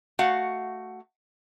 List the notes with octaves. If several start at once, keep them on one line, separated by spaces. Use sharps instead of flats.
A3 F#4 F5 F#5